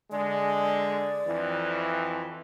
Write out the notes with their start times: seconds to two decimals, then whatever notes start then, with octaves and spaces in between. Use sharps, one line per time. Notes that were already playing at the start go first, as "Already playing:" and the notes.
0.12 D3 G#3 D5
1.25 F2 E3